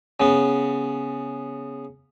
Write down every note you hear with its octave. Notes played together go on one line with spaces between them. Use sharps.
C#3 B3